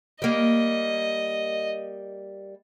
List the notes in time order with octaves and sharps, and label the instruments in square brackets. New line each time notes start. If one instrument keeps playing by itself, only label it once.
[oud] G3 A#3 [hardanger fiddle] D#5